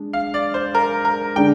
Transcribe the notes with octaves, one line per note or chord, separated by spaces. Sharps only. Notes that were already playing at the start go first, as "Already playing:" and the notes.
Already playing: G#3 D4
F5
D5
C5
A#4
A#4
D3 G#3 D4 G5